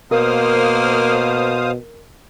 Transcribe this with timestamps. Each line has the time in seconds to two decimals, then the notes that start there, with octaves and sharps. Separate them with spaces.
0.11 B2 A#3 A#4 C5 F5 D#6